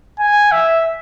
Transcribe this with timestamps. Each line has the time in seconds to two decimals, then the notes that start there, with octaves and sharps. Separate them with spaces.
0.19 G#5
0.51 E5